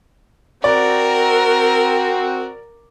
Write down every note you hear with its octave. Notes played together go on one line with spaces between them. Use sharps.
C4 F#4 A#4 D5